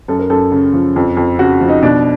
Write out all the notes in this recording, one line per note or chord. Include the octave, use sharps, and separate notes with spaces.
F#2 A4
A#4
F#2 A4
C#3
F3
F2
F2
C#3 F#4
F3
D#4
B2 D4